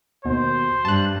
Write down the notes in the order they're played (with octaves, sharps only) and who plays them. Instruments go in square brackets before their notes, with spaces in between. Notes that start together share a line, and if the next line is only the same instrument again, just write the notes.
[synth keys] D#2 B2 [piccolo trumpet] C5
[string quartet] G2 [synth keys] A5 F#6